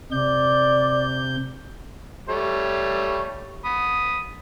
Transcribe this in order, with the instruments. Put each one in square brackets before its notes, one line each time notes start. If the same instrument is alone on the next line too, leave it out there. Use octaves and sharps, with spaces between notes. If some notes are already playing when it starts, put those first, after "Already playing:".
[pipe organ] C3 G6 [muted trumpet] D5
[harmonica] G3 A3 C#5
B5 D#6